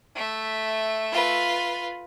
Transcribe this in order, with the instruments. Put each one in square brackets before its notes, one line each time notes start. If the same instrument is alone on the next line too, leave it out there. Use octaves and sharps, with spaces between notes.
[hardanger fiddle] A3 E5
[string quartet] F4 B4